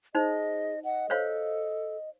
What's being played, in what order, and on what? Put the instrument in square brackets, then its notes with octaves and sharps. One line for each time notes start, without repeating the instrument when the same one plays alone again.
[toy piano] D#4 C5 [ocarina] G#4 [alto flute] D#5
[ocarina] D#5 [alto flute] F#5
[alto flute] A4 [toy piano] C5 C#5 F5